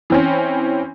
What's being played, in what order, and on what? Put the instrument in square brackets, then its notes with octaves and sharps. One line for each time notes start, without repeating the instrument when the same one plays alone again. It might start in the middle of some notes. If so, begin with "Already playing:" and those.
[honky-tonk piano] E3 C4 C#4